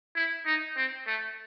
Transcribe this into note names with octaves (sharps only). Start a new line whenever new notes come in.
E4
D#4
C4
A3